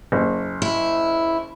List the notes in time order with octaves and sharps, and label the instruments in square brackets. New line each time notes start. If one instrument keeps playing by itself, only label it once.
[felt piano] F#1
[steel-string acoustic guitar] E4